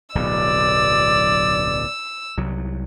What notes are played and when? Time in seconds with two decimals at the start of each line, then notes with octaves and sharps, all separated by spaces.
0.15 D1 B1 B2 D5 E6
2.37 C2 F#3